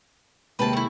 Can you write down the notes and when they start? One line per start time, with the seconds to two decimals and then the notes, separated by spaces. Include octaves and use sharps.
0.59 D#2 C3 G#3 B4 A5
0.73 A3 E4